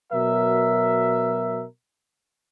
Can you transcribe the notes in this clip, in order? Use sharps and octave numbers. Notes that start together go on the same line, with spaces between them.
B2 F#3 A#4 E5